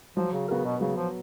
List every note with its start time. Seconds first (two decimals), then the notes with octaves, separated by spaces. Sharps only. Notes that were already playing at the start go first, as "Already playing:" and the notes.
0.17 F3 F#3
0.33 C#3
0.48 C#3 B3 F#4 A#4
0.64 B2
0.81 C#3 F#3
0.96 F3